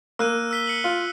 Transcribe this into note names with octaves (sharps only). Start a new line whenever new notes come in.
A#3 E6 F#6 D#7
E6 B6 G7
C#7 F#7
F4